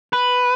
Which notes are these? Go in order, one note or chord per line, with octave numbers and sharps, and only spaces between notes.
B4